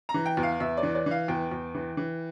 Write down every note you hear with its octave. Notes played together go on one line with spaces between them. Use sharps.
A#5
E3
G5
E2
F5
E2 E5
D5
E3
D5
E3 F5
E2 G5
E2
E3
E3